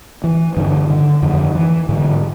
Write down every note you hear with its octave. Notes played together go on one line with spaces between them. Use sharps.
E3
G2 D3 D#3
D3
F2 D3 D#3
E3
G#2 D3